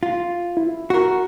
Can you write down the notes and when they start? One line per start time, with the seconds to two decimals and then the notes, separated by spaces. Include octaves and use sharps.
0.03 F4
0.57 E4
0.90 F#4 A#4